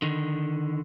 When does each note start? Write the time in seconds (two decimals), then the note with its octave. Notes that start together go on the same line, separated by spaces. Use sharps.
0.02 D3 D#3